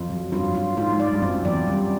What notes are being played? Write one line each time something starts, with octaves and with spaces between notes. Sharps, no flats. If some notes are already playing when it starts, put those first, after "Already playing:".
Already playing: F2 F4
F#3
G2 F4
F4
G#2 F4
G#2
D5
G2
F#2 C4
E2 D5
F#2 G3